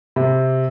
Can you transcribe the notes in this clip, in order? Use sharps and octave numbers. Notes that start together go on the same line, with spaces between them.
C3